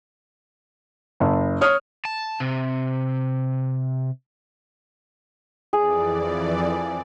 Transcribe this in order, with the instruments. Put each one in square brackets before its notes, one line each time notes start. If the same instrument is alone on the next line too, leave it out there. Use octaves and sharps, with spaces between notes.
[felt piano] F#1
C#5 D#6 F6
[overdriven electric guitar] A5
C3
[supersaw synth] F2 E3 D5 [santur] G#4